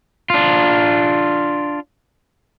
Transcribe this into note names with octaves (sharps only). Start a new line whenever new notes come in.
D4 F4